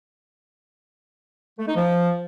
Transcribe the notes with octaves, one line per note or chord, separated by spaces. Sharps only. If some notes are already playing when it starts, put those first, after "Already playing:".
A3
D#4
F3